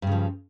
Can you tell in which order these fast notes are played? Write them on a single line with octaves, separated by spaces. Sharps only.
G2 C#3 F3